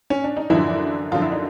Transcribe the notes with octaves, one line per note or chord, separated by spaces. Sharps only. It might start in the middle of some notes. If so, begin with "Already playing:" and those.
C#4
D4
D#4
F#2 D3 E3 F3 E4
F#2 D3 F3 F4
E4
D#4